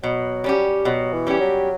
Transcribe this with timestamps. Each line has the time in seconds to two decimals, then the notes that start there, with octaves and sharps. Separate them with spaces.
0.03 B2 F#3
0.44 G3 C#4 G4
0.85 B2 F#3
1.13 E3
1.27 G3 C#4 G4
1.40 F#3